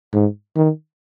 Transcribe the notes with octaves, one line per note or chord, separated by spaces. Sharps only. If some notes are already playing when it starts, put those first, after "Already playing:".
G#2
D#3